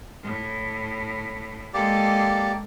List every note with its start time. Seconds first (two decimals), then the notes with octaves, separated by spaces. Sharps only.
0.23 A2
1.74 G#3 A#3 G4 A4 D5